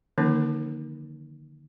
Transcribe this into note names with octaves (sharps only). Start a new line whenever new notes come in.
D3 D#3 F3 A#3 C#4 D#4